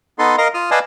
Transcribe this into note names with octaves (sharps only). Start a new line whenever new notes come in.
B3 D#4 A4 C6
A#4 D#5 F5 A#5
F4 D#6 F6
B4 D5 D#5 F5 G#5 A5